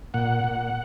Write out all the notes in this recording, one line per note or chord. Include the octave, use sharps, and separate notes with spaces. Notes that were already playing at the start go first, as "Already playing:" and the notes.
A#2 F#5
A#2